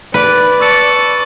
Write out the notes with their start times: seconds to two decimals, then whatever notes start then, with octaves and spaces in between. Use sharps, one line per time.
0.14 B4 D5
0.60 A5 C#6 E6 C#7